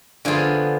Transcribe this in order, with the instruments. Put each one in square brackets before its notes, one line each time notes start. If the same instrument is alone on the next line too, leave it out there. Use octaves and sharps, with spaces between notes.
[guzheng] D3 F3 B3 F4 G#4